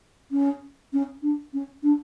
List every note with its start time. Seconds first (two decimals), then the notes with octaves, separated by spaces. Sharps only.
0.31 C#4
0.93 C#4
1.23 D4
1.54 C#4
1.83 D4